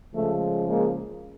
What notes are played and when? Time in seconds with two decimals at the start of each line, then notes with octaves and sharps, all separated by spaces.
0.14 C#3 F3 G#3 A3
0.68 G#3 A#3